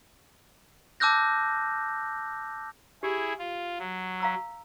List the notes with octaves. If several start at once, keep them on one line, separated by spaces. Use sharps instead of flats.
A5 D6 E6 F#6 G6 A#6
E4 G4 G#4
F4
F#3
F5 A#5 E6